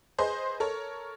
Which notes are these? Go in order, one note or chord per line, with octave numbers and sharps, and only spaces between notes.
G#4 B4 C5 D#5 C6
A4 A#4 C#5